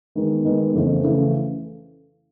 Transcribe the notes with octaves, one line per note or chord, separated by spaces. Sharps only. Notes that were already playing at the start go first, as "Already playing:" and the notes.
D#3 G#3 B3
D#3 G#3 B3
F2 C#3 E3 A3
C#3 E3 A3